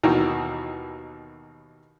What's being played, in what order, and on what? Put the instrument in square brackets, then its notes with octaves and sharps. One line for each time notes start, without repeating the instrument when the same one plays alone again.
[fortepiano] D#2 B2 D#3 E3 G5 A#5